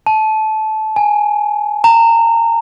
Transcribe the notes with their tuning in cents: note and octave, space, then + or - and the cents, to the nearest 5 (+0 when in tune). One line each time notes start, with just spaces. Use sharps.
A5 -20
G#5 +0
A#5 -25